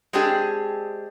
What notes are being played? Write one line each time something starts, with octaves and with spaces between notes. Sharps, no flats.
G#3 C4 D4 G4 G#4